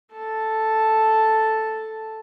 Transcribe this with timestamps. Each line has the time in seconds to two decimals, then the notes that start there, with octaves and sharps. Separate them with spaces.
0.12 A4 A5